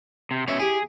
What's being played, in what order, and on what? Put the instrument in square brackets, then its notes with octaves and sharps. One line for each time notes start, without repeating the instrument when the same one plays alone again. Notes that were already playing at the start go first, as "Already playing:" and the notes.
[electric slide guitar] C3
[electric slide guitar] B2 C#5 E5 [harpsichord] C#4
[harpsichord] E4 G4 [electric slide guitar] G#4